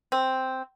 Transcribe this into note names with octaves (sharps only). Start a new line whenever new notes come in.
C4